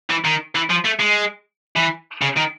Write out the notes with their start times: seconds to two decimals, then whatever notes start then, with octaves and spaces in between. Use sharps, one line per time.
0.10 E3
0.25 D#3
0.55 E3
0.70 F3
0.85 A3
1.00 G#3
1.76 E3
2.22 C#3
2.37 D#3